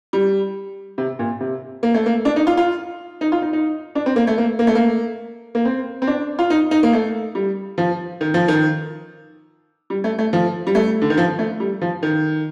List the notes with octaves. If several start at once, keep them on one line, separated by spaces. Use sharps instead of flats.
G3
C3
A#2
C3
A#3
A3
A#3
D4
D#4
F4
F4
D#4
F4
D#4
D#4
D4
C4
A#3
A3
A#3
A#3
A3
A#3
A#3
C4
C4
D4
F4
D#4
D#4
A#3
A3
G3
F3
D#3
F3
D#3
G3
A3
A3
F3
G3
A3
D3
D#3
F3
A3
G3
F3
D#3